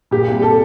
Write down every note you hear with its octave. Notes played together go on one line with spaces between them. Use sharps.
A#2 G4
C2
A4